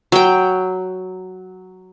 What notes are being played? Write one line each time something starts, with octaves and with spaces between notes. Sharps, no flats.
F#3 G5